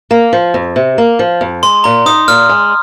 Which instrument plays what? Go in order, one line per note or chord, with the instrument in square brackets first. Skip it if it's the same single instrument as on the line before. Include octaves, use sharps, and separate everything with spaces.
[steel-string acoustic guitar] A#3
F3
F2
C3
A#3
F3
F2
[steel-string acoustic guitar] G#3 [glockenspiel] C6
[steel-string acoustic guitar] A#2 [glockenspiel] A#5
[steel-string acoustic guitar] D#4 [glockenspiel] D#6
[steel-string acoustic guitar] A#2 [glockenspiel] F6
[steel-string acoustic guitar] G#3